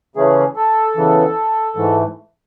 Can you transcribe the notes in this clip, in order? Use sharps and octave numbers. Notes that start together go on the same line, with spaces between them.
C#3 E3 A3 C#4 G#4
A4
E2 C#3 E3
G#2 E3 A3